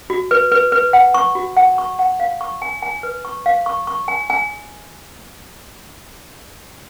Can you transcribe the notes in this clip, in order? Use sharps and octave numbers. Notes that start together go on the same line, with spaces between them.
F#4
B4
B4
B4
F#5
C#6
F#4
F#5
C#6
F#5
F5
C#6
G#5
G#5
B4
C#6
F5
C#6
C#6
G#5
G#5